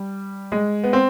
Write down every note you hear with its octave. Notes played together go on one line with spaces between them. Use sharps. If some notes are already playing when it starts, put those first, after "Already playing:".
Already playing: G3
G#3
B3
C4